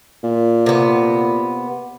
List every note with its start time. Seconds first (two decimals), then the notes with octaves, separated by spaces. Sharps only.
0.24 A#2
0.66 C3 B3